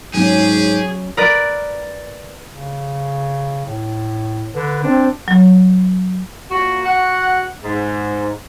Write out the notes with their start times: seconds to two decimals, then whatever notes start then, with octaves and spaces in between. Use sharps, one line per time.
0.14 G#2 F#3 C#4 G4 G#4
1.17 A#4 B4 D5
2.53 C#3
3.66 A2
4.54 D3 B4
4.83 C4 D4
5.28 F#3
6.50 A#2 F#4
6.85 F#4 F#5
7.62 G#2